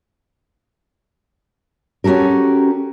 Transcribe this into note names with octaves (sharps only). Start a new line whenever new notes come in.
C#4 F#4 G4 A4 A#4